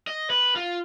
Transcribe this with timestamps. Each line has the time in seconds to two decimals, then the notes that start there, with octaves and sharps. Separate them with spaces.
0.07 D#5
0.30 B4
0.56 F4